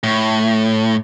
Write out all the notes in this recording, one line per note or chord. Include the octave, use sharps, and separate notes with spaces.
A2